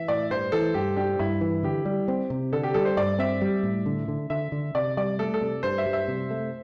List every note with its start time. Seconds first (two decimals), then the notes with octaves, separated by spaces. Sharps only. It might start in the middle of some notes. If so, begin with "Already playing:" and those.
Already playing: E3 E5
0.08 A2 D5
0.30 G2 C5
0.52 E3 A4
0.74 G2 G4
0.96 D4 G4
1.19 G2 E4
1.41 E3
1.63 D3 G4
1.85 G3
2.08 C4
2.30 C3
2.53 D3 A4
2.63 G4
2.74 G3 A4
2.85 C5
2.97 G2 D5
3.19 C4 E5
3.42 G3
3.63 A2
3.86 D3
4.08 D3
4.30 D3 E5
4.52 D3
4.75 C3 D5
4.97 G3 D5
5.19 A3 A4
5.34 A4
5.41 C3
5.63 G2 C5
5.78 E5
5.86 G3
5.93 E5
6.08 C3
6.30 A3